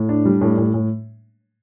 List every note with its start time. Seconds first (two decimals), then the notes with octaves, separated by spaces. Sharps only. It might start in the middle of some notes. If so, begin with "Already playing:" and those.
Already playing: A2
0.09 D4
0.25 G3
0.41 A2
0.58 A2
0.74 A2